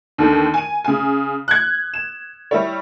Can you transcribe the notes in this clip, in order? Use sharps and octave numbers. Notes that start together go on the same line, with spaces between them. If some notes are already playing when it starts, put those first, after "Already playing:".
D#2 D3 D#3
G#5 D#7
C#3 G#5
F#6 G#6
E7
G3 E4 C#5